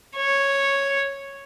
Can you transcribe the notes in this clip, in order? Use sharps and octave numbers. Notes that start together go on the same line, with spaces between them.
C#5